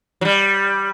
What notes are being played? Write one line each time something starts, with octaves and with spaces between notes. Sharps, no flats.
F#3
G3